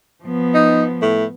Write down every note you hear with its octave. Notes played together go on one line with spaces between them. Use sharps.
F3 B3
D#4
A2